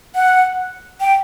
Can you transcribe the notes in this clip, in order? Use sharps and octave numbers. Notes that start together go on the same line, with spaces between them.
F#5
G5